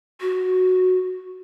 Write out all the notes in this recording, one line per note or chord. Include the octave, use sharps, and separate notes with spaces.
F#4